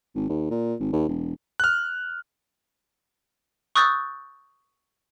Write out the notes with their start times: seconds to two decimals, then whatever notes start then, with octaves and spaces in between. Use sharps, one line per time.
0.15 G#1
0.29 D#2
0.51 A#2
0.80 G#1
0.93 D#2
1.09 E1
1.60 F6 F#6
3.76 C#6 D#6 E6 F#6 G6 A6